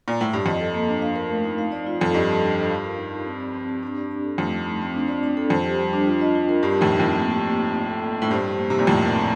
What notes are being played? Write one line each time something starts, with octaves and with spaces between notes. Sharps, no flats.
A#2
A2
G2
F2 D#5
A4
A#3
D4
F5
A#4
A3
D#4
F5
D5
F4
F2 A4
G2 D#5
A4
D4
F4
F5
A#4
D#4
G4
C4
D5
C4
G4
D4
D5
D4
A4
F2 A3
D#4
A3
C4
D4
D5
D4
A4
F2 C5
G4
G3
D4
F4
D#5
F4
A#4
G2 G4
F2 A2 D#4
A3
F2 A2 C4
A#3
G4
A#3
D#4
D5
A4
A#3
D4
A2
G2 C5
G4
A#3
C3 D#4
A#2
F2 A2 D5
A#4
A#3